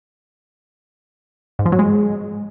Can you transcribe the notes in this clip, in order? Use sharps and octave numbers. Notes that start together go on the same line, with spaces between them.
G#2
F3
F#3
G#3